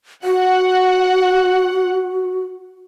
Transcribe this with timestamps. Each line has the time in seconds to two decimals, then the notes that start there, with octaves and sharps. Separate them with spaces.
0.24 F#4 F#5